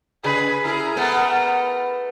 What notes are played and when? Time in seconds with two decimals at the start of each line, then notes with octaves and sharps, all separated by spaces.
0.24 C#3 G#4 B4
0.65 E4 G#4 A#4
0.96 A3 B3